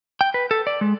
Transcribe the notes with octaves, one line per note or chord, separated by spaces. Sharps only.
G5
B4
A4
D5
G#3